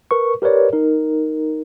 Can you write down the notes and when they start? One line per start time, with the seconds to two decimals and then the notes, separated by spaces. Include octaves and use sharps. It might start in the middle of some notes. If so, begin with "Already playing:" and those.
0.11 A#4 B4 C#6
0.42 G4 A#4 B4 C#5 D5
0.73 D#4 A#4